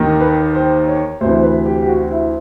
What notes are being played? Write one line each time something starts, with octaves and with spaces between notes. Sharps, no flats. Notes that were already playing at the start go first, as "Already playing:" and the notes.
Already playing: D#2 D#3
B4
C5
C#5
D2 C3 E3 C5
B4
G4
G4
F#4
E4